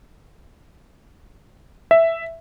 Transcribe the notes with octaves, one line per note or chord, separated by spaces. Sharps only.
E5